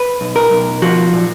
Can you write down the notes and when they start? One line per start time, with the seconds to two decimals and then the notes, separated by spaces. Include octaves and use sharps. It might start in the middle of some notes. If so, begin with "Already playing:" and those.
Already playing: B4
0.21 B1
0.36 A#4
0.51 B1
0.82 F3 F#4
1.13 A#2